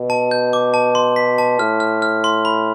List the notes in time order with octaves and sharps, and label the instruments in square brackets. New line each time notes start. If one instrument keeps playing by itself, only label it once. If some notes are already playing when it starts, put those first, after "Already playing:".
Already playing: [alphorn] B2
[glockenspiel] A5
G6
D6
A5
C6
B6
A5
[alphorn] A2 [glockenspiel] F6
[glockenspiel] F6
F6
C6
B5